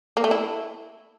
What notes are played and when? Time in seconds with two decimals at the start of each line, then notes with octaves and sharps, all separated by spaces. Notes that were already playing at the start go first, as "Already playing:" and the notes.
0.17 A#3
0.24 A3
0.31 E4